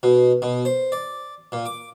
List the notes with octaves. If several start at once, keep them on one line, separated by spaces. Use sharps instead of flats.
B2
B2
C5
D5
A#2
D6